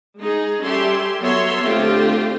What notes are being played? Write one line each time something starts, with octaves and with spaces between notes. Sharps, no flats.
G#3 D#4 G#4
G3 C#4 G4 A4 E5 C6
F#3 B3 A4 C#5 E5 C6
D3 A3 C4 F4 G4 C5